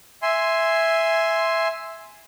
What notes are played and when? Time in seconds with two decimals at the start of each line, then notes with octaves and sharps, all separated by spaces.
0.22 E5 G#5 C6